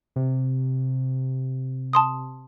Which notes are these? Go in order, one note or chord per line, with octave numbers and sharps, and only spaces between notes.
C3
A5 C6 D#6